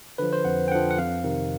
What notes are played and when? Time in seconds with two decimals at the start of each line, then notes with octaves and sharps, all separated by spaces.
0.18 D3 F3 B4
0.33 C5
0.45 F2 F#5
0.68 G5
0.71 D3 F#5
0.75 F3
0.91 F#5
0.97 F2 F5
1.24 C3 D#3